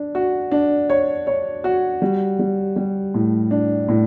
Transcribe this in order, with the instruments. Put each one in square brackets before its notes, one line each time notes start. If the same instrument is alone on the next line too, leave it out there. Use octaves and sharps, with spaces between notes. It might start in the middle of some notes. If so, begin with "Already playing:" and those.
Already playing: [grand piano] D4
F#4
D4
C#5
C#5
F#4
G3
G3
G3
A2
D4
A2